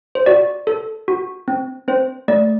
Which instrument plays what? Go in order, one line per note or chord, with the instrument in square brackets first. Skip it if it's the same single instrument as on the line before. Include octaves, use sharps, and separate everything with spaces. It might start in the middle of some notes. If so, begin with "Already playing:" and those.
[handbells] C5
F#4 D5
A4
F#4
C4
C4 C5
A3 D5